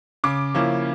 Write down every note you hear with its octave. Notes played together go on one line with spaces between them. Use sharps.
C#3 D6
F3 A#3 C#4 E4